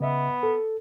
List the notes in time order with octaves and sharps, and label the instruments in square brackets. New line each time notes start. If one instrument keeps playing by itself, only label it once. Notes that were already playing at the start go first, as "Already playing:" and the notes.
[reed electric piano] C#3 D#5 E5 [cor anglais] B3
[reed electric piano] A4